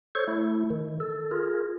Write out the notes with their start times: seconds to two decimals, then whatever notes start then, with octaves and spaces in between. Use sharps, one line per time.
0.15 A4 C5 C#5 C#6
0.27 A3 E4
0.70 D#3
1.00 A4
1.31 F4 G#4 A#4